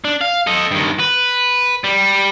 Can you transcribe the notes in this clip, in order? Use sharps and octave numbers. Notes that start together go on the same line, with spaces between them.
D4
F5
A4 D#5
G2 D#3
B4
G3